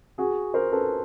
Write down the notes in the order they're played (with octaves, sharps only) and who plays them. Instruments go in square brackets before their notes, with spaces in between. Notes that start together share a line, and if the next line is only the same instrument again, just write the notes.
[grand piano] F#4 G#4
A#4 C5
A4 B4